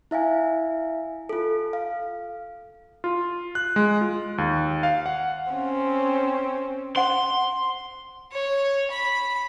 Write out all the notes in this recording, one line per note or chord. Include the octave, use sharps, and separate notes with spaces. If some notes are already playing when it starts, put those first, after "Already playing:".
E4 E5 F5 G#5
F4 A4
F5
F4
F#6
G#3
F4
D#2
F5
F#5
C4 C#4
C5 F#5 C6
C#5
B5